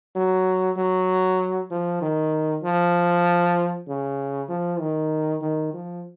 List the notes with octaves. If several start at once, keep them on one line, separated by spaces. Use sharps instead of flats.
F#3
F#3
F3
D#3
F3
C#3
F3
D#3
D#3
F3